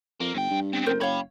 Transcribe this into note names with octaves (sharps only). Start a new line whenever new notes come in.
F2 A#3
G1 F2 G5
G2
B3 C4
F#1 A#4 C5
F#1 C#5 F5 G5 B5